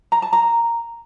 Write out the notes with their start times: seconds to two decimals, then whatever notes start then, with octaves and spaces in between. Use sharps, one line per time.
0.12 A#5
0.22 A5
0.33 A#5